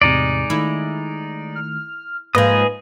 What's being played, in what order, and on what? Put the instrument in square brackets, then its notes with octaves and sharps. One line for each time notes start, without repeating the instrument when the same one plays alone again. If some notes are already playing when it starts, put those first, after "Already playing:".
[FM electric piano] E2 A2 C3 [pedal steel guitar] G#3 D#4 D5
[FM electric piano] D#3 A3 [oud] E4
[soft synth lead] F6
[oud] G#2 F3 [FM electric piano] A#3 [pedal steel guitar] G#4 D#5 D#6 [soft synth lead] B4